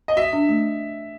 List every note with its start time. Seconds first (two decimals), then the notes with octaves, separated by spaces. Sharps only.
0.08 D#5
0.17 F#4 E5
0.33 D4
0.49 A3